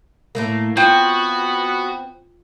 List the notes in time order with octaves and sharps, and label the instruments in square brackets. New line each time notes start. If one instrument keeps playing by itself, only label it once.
[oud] A2 A3 A#3
[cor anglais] B3 [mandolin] C4 [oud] F4 [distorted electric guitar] F#4